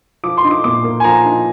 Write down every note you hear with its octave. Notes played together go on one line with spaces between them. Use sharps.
F3 D6
C6
D#4
D6
A#2 D6
A#3
G#5
F3 A#5
D#4